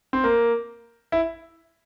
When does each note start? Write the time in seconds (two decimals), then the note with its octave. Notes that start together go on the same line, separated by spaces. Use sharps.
0.13 C4
0.24 A#3
1.12 E4